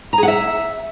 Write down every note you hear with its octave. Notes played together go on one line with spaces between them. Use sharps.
A#5
G#4
F#5
E5